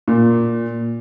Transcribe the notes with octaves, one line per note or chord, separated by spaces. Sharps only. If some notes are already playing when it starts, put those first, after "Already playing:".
A#2